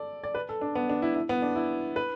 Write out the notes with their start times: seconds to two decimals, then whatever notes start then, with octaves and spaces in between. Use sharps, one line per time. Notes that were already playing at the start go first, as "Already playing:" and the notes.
Already playing: A4 D5
0.24 D5
0.35 B4
0.49 A4
0.61 D4
0.75 B3
0.89 D4
1.02 E4
1.15 E4
1.29 B3
1.42 D4
1.56 E4
1.96 B4